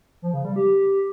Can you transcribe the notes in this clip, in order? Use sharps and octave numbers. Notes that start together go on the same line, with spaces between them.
F3
C#3
G3
G4